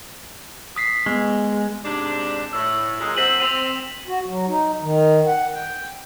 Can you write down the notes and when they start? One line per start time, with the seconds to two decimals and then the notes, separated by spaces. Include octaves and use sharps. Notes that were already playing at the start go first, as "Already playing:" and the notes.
0.76 D#6 B6 C7
1.06 G#3 B3
1.84 G#2 C3 D4
2.53 A2 E6
3.00 F#2 A#2 G#3
3.17 A#2 F#3 C4 B6 D#7 F#7
3.40 C4 D#7 F7
4.07 F#4
4.27 F#3
4.47 D#4
4.82 D#3
5.26 F#5
5.54 G5